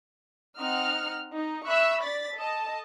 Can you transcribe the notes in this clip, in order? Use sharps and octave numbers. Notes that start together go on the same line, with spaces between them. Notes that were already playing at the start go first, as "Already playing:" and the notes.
C4 D#4 F#5 F6
D#4
E5 B5 C#6 E6 F#6
D5 A6 B6
A4 D#5 A5